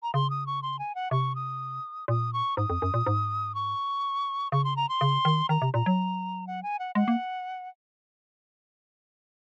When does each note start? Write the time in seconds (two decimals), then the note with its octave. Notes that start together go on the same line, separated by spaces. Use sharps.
0.03 A#5
0.14 C#3 C6
0.30 D#6
0.47 C#6
0.62 C6
0.79 G#5
0.95 F#5
1.11 C3 C#6
1.35 D#6
2.08 A#2 D#6
2.33 C#6
2.57 G#2 D#6
2.70 F2
2.82 F#2
2.94 A#2
3.06 G#2
3.55 C#6
4.52 C#3 C#6
4.64 C6
4.76 A#5
4.89 C6
5.01 C#3
5.25 D#3
5.49 D#3 A#5
5.62 C3
5.74 A#2 A#5
5.86 F#3
6.47 F#5
6.63 G#5
6.79 F#5
6.95 G#3 F#5
7.08 A#3